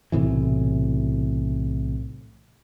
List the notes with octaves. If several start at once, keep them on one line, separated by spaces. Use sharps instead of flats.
B1 A2 C3 E3